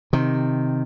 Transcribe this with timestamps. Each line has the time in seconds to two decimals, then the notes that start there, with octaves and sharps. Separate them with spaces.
0.13 C3 D#3